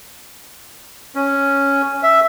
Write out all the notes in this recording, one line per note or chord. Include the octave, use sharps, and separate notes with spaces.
C#4
E5